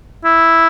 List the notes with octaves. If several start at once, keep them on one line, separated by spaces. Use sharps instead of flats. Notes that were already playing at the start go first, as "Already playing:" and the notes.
E4